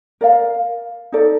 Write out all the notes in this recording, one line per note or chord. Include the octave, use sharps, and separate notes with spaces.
A#4 D5 F5
D#4 A4 D5